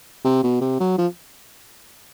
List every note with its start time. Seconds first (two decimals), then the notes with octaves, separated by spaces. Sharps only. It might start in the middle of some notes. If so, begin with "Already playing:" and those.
0.25 C3
0.43 B2
0.61 C3
0.80 F#3
0.98 F3